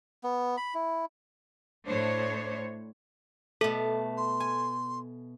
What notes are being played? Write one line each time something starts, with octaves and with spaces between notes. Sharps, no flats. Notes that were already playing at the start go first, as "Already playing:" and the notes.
B3
B5
E4
A2 D4 C5 C#5
B2 A3 A4
C6
G#5